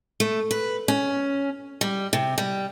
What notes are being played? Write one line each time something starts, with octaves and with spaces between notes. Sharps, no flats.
A3
B4
C#4
G3
C3
G3